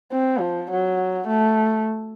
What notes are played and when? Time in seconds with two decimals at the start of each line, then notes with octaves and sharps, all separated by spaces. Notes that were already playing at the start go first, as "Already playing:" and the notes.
0.12 C4
0.40 F3
0.70 F#3
1.28 A3